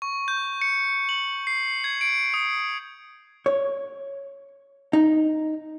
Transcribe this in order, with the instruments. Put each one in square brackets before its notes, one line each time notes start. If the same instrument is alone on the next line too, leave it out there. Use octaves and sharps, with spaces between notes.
[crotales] C#6
G6
C#7
F#7
C7
G#6
D7
D#6
[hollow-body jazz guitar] C#5
D#4